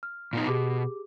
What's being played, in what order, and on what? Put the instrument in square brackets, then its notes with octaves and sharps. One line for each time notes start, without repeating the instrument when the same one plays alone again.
[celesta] F6
[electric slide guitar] A#2 B3 D#4
[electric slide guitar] B2 [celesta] G4 G#4 D6